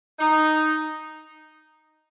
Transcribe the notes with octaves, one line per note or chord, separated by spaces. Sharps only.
D#4